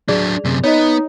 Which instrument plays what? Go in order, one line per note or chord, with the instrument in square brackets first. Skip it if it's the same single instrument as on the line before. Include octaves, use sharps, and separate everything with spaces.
[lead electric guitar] F#3 D4 [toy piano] G#4 D5
[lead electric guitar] F#2 C3
[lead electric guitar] B3 [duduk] D#4 [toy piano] C#5 D#5